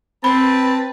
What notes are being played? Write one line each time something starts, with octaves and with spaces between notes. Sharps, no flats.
C4 B4 A5 B5